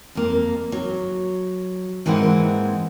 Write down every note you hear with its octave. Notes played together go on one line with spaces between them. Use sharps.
F2 A#3
F#3
G#2 E3 G#3 A#3 C4 F#5